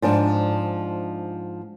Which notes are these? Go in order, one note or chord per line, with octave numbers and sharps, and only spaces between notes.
G#2 F3 D4